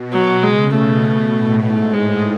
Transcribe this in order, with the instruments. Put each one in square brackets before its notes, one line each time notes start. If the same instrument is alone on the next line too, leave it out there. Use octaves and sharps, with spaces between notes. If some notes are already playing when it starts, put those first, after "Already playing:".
Already playing: [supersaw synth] B2
[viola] F#3
[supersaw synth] C#3 [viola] G#3
[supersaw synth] B2 [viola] A3
[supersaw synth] A2
[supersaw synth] G#2 [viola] A3
[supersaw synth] A2 [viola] G#3